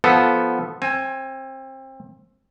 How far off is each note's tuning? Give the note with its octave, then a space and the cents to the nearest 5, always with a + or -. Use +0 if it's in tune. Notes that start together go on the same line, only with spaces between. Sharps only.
F3 +0 B3 +0 A4 +0
C4 +25 G#5 +0